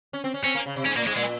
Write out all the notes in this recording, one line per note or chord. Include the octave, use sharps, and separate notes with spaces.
C#4
C4
C#4
C4 C#4
A#3
C#3
C3
G#2 C#4
A#2 A#3
G#2 G#3
A#2 G#3